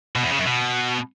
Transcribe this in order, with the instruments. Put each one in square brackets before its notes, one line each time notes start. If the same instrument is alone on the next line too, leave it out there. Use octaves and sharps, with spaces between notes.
[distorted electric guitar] B2
E2
C#3
F#2
B2